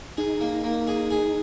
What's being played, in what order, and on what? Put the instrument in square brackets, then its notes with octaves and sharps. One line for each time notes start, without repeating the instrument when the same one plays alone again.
[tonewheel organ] D#4 [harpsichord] G#4
[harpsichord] A#3
A#3
G#4
G#4